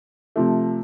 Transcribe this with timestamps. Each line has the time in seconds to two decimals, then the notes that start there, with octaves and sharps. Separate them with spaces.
0.36 C3 F3 A3